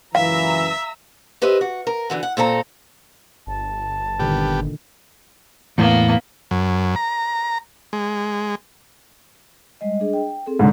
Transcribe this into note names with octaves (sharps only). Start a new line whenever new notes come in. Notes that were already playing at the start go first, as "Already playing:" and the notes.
C#2 F#2 E3 E5 F5 A#5 E6
G4 B4 C5 D#5 E5
F#4
A#4
D3 E3 F#4
F#5
A#2 C4 A4 A#5
G1 A5
A#2 D3 D#3 G3 B3 G4
E2 A2 A#3 B3
F#2
A#5
G#3
G3 G#3 D#5
D4 G#4 D#5
G5
C4 G#4 A4
G#2 D3